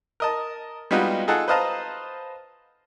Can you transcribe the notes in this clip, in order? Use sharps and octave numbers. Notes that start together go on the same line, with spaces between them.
A#4 D#5 A5
G3 G#3 B3 D#4 F4 F#4
D#4 F4 G#4 A4 F#5 A5
B4 C5 D#5 F5 A5 A#5